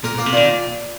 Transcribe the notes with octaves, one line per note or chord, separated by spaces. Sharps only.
A#2 A#4
A#2 A#3
C3
A#2 D#3